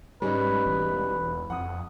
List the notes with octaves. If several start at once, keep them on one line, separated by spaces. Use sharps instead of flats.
G#2 G3 C#4 D#4 B4
E1
F2 F#5 D#6